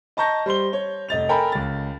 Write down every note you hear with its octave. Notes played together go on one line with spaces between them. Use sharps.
D#5 A5 A#5 C#6 G6 A#6
G3 C5 C6 G7
C#5
F1 D#5 A6 F7
A4 A#4 G5 G#5 A#5 B5
C#2 A6